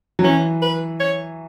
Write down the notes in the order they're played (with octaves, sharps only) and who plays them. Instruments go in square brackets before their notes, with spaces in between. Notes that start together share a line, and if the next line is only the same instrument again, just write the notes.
[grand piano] F#3
[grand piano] E3 [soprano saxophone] C#4
[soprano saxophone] B4
C#5